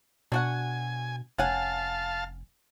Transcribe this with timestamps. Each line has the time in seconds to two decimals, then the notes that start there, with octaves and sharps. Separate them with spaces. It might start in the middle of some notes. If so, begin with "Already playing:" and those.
0.32 B2 D4 F#4 F#5 G#5
1.38 F1 C#4 F5 F#5 G#5 A5